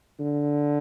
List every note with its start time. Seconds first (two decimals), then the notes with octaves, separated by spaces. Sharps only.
0.20 D3